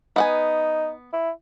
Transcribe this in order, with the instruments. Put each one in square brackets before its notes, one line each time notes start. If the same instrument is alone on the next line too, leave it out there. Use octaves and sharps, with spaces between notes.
[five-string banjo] B3 F#5 G#5 [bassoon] D#4
[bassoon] E4